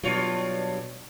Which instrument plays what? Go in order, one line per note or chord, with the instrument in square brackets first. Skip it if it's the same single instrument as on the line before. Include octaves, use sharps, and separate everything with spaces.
[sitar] G2 F4 C#5 [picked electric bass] B2 F#3